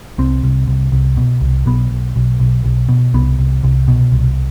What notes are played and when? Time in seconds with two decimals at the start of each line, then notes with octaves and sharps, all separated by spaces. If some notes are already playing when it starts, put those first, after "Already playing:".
0.18 C2 C4
0.44 C2
0.68 C2
0.92 C2
1.17 B2
1.41 C2
1.66 B1 B3
1.91 B1
2.16 B1
2.40 B1
2.65 B1
2.89 B2
3.14 C2 B3
3.38 C2
3.63 C2
3.88 B2
4.12 C2